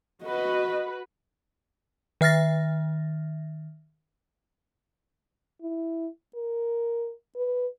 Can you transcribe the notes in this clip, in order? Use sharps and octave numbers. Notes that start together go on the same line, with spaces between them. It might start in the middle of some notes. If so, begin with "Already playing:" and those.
F#4 B4 D#5
D#3 E5 F6 A6 A#6
E4
A#4
B4